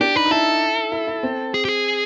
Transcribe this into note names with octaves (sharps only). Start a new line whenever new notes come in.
D4 G4
D#4 B4
D#4
E4 A4
E4
E4
C4
G#4
G4
G#4